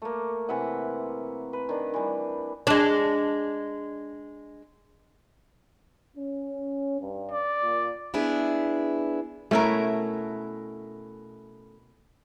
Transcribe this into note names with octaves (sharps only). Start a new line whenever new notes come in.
A3 A#3
C3 E3 E5 F#5
B4
D#3 D4
E3 G3
G#3 D4
C#4
G2
D5
A#2
B3 D4 E4 G#4
B2 A3 C#4 E4 A#4